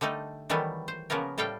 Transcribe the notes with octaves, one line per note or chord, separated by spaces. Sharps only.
D3 G3 A3 D#4 A4
D#3 E3 F#3 G3 A3 B3
C5
C#3 F3 A#3 B3 A#4
A2 G3 A4 F5 G5